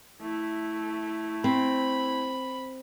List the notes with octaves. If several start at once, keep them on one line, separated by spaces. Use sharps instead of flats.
A3 E4
C4 B5